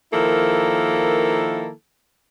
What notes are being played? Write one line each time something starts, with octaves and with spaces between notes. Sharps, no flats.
D#3 F3 A#3 E4 A4